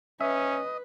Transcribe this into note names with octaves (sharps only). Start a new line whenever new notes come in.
C#4 B4 D#5 E5